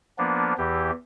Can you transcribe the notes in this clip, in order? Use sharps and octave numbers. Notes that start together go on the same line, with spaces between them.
F3 A#3 B3 D4
E2 E3 G4